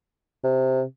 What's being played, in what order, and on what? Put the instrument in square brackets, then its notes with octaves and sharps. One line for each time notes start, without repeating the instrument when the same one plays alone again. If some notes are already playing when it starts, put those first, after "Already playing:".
[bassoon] C3